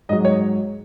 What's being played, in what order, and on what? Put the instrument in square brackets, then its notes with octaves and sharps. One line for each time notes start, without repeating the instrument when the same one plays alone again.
[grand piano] G#2 D#5
F#3
C#5